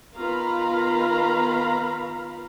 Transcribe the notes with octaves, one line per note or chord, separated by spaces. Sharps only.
D#3 B3 F4 F5 A#5 B5